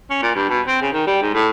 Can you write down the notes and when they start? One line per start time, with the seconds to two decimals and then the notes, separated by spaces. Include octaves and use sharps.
0.10 C#4
0.22 A#2
0.35 G2
0.49 B2
0.67 C4
0.81 C#3
0.93 D#3
1.07 G3
1.22 G#2
1.34 A2